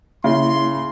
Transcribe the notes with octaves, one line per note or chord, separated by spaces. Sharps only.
C#3 A#3 E4 E5 C6